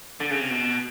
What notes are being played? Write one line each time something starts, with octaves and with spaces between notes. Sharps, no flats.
D3
C#3
C3
B2